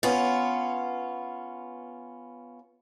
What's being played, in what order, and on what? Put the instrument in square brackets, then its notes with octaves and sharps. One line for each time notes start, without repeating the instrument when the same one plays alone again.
[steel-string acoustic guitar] B3 C#4 F4